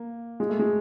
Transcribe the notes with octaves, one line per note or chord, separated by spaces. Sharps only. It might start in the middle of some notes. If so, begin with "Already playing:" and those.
Already playing: A#3
G#3
A3
G#3